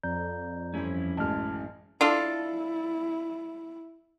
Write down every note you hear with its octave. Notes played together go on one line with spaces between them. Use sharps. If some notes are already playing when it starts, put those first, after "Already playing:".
F2 D5 A#5 G6
G2 E3 C4 C#4 E4
A1 F#2 G#3 A5 F6
D4 E4 F4 A4